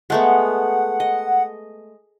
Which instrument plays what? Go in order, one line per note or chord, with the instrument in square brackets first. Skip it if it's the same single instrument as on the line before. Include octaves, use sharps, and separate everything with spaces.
[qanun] G#3 A3 B3 [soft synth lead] F#5
[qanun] D#5